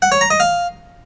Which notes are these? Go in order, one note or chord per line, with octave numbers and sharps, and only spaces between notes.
F#5
C#5
A#5
D#5
F5